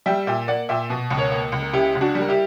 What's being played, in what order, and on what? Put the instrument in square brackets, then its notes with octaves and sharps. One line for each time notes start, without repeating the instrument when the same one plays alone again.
[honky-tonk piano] G3 E5 G5
A#2 E5 G5
A#3 D5 F#5
A#2 E5 G5
B2
C#2
A#4 C#5
A#3
C#2
A#4
C#3 E4 G4
C#2
D4 F#4
G3
A#4
E4 G4